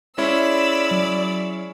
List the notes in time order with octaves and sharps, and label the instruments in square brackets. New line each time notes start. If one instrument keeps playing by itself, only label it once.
[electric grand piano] G#3 C#4 E4 [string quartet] D5 B5 E6
[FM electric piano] F#3